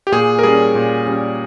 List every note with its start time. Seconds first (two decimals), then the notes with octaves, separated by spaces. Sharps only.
0.07 G4
0.12 A#2 G#4
0.39 A#4
0.43 G3 C#4 G#4
0.75 A#2
1.07 G3 C#4